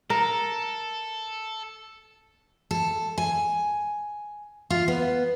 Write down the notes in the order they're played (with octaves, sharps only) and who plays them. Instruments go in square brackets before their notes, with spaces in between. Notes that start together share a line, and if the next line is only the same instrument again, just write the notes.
[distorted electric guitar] A4 [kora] A#4
[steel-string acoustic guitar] A4
G#5
F4
B3